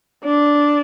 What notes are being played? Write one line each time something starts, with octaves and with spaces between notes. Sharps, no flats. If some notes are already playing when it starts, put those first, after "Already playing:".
D4